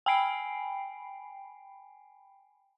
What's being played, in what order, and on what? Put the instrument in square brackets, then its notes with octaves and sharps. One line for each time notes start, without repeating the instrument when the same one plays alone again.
[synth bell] G5 G#5 B5 C7 D7